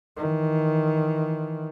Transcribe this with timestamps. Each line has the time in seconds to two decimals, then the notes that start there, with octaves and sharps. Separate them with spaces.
0.17 D#3 E3